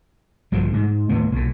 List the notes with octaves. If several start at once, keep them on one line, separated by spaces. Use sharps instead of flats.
A#1 G2 D3 F3
G#2
D#2 A2 B3
B1 A#2